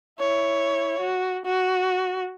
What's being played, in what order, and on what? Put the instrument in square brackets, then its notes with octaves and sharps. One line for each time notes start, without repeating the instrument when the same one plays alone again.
[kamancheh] E4 C#5
F#4
F#4